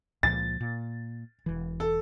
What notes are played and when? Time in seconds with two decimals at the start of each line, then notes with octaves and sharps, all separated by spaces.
0.23 C#2 A#2 F3 A6
0.60 A#2
1.46 E1 E3
1.80 A4